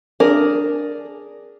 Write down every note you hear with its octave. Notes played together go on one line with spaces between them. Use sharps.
D4 G#4 A#4